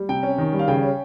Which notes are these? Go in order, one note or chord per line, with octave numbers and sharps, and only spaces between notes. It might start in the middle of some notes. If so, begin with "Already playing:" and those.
Already playing: G3
C3 G5
C#4
D#3
G3
F5
C#3 G5
C#4